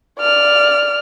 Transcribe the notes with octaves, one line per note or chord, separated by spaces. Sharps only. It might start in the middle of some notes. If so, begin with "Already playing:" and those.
D5 F6